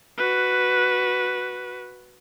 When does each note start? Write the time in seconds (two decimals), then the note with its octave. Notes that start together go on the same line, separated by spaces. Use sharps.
0.18 F#4 B4